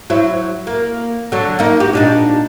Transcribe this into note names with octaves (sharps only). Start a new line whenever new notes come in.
F#3 E4 C5
A#3
D3 F#3
A#3 D#4
F#4 G4
A#2 D4 D#4